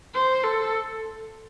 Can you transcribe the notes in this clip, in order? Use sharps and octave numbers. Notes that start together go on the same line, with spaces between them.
C5
A4